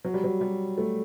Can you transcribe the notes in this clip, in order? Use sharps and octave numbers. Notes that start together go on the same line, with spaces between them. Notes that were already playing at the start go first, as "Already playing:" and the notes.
F#3
G3
F#3
G3
A3